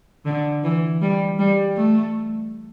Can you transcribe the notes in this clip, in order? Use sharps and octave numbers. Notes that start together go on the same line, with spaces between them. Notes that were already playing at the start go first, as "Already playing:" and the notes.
D3
E3
G3
G3
A3